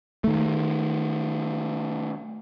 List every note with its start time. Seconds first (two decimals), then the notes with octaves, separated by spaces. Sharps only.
0.24 D#3 A3